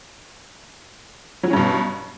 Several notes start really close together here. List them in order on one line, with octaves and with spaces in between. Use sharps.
F#3 E3 C#4 G2 B2